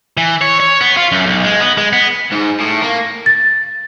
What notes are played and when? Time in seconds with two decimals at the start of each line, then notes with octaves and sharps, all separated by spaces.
0.17 E3
0.41 C#5
0.60 C#5
0.81 B3
0.97 F4
1.12 F#2
1.26 B1
1.44 G#3
1.60 B3
1.77 G#3
1.93 B3
2.32 G#2
2.60 A2
2.82 A#3
3.26 A6